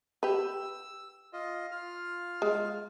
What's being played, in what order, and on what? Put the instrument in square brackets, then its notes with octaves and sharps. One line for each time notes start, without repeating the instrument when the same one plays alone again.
[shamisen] G4 B4 [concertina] E6
[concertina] F4 D#5
F4 F6
[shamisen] G#3